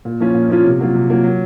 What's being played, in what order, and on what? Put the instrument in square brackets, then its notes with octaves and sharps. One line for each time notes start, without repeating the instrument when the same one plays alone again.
[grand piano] A#2
F3 A#3 C#4 F4
A#2
F3 A#3 C#4 F4
C3
F#3 A#3 F4
C3
F#3 A#3 F4
F#3